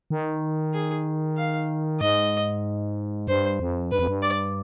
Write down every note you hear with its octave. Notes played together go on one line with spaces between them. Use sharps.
D#3
G#4
F5
G#2 D#5
G2 C5
F2
G2 B4
F2
G2
D5